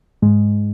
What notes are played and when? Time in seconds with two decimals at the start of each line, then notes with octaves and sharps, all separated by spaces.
0.22 G#2 G#3